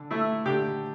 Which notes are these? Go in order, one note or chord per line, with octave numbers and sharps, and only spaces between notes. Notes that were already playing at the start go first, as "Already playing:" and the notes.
Already playing: D3
A3 E4
D3 G4